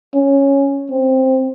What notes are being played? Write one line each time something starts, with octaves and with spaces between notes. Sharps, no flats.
C#4
C4